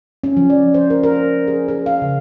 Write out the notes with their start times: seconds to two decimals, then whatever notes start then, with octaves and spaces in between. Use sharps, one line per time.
0.24 C#4
0.37 F3
0.50 D5
0.74 C5
0.90 A#4
1.03 A#4
1.48 G#4
1.68 A#4
1.86 F5
2.02 C#3